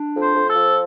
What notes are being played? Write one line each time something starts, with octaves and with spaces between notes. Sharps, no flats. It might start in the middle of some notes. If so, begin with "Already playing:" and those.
Already playing: D4
F2
C5
F2
A4
F3